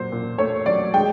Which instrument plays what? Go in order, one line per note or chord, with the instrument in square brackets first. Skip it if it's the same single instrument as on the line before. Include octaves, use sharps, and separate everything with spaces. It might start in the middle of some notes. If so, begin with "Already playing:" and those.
Already playing: [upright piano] A#2 F#3 C5
A#2
A3 C#5
F#3 D5
G#3 G5